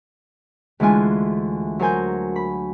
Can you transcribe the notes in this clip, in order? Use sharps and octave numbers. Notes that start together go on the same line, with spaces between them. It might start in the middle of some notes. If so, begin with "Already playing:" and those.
D2 E3 G#3 E4 F4 G#5
F#3 A#4 C5 G#5 G6
B5